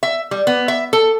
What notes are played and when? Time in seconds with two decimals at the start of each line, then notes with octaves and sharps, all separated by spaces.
0.03 E5
0.31 G3
0.47 B3
0.68 E5
0.93 A4